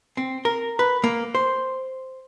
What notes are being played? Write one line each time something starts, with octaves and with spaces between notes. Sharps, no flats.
C4
A#4
B4
A#3
C5